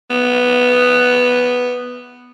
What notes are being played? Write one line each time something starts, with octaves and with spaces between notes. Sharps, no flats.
B3